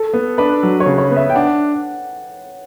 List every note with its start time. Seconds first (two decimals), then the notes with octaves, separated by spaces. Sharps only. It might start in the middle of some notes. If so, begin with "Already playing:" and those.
Already playing: A4
0.14 B3
0.38 D4 B4
0.63 F#3
0.80 C#5
0.86 C#3
0.98 C#5
1.11 B3
1.16 E5
1.30 G5
1.35 D4 F#5